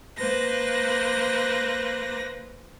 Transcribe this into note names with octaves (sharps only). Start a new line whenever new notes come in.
A#3 B4 C5 A#6